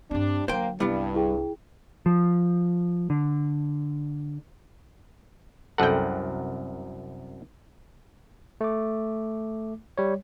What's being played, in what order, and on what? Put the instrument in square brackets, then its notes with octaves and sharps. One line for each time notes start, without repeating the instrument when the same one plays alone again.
[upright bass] G2 C4 [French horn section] C3 G3 D4
[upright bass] D3 F#3 [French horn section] A#3 [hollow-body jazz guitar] C5 G5
[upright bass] C2 [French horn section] G2 [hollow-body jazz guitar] G3 B3 [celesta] E4
[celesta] E4 G#4 G5
[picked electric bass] F3
D3
[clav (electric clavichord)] C2 F#2 F#5 [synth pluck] A4 G5
[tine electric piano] A3 D6
G3 C#5